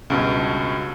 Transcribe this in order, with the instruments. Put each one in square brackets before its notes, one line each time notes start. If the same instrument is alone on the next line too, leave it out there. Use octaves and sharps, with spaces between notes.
[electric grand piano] C#2 G2 B2